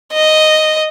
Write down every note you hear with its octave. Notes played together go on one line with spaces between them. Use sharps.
D#5